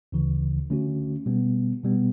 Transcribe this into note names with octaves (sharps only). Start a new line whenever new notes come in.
D2 C#3 E3
D3 A3 C#4 F#4
B2 G3 B3
B2 G3 B3